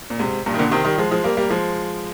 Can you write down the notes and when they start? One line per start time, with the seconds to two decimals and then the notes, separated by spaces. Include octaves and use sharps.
0.10 A#2
0.20 G#2 C3
0.46 G2 A#2
0.54 D#3
0.59 A#2 D3
0.71 C3 D#3
0.85 D#3 G3
0.98 F3 G#3
1.11 F3 G#3
1.24 G3 A#3
1.37 G3 A#3
1.50 F3 G#3